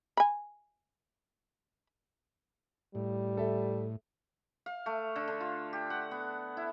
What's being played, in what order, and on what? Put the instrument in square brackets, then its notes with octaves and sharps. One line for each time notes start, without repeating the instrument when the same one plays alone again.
[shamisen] G#5 B5
[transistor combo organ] A2 [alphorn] G3
[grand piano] A4 E5
[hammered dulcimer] F5
A3
D3
D3
F4
G4
F#5
B3
E4